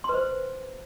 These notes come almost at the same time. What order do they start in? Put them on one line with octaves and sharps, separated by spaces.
C6 B4 C5